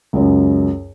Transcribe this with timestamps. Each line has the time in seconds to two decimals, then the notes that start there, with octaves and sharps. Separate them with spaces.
0.13 C#2 F#2